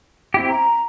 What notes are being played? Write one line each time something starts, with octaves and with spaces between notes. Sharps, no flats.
C4 E4 G4
A#5